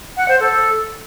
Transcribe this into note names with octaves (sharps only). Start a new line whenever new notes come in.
F#5
C5
A4